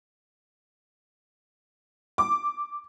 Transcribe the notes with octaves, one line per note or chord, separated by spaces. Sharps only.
D6